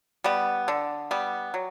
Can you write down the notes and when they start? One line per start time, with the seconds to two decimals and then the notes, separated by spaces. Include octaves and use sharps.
0.24 G3 B3
0.68 D3
1.11 G3 B3
1.54 F#3